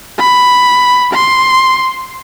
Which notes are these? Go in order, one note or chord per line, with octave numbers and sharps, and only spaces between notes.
B5
C6